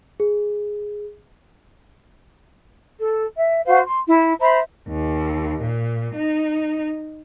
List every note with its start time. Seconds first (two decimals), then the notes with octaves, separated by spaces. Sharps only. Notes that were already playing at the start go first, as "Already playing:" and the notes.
0.20 G#4
2.99 A4
3.36 E5
3.65 F#4 C5 F5
3.84 C6
4.06 E4
4.40 C5 E5 A#5 B5
4.89 D#2
5.62 A#2
6.15 D#4